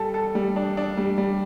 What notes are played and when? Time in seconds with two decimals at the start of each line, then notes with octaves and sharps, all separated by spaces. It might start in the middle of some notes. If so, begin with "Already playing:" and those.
Already playing: G3 A4
0.14 A4
0.35 G3
0.56 D4
0.77 D4
0.97 G3
1.18 G3